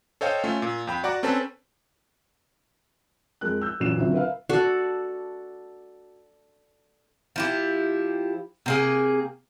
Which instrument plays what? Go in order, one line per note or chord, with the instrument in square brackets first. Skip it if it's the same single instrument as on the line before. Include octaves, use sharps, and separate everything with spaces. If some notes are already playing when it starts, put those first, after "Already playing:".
[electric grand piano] A4 C5 C#5 D#5 F5 G5
A3 C#4 F4
A#2
F2 G5 B5
F#4 D5 F#5 A#5 D6
C4 C#4 A4 B4 A5
[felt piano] F2 G#3 A#4 F#6
E6 G6
A1 F#2 A#2 C7 E7
C#2 D3 F#3 C4 F4 E5
A#4 B4 E5 F5
[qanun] F#4 [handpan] A4 D5
[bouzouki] F3 E4 G4
C3 A#3 G#4